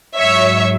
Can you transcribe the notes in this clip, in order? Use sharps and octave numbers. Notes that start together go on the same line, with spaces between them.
G#2 F#3 C#5 E5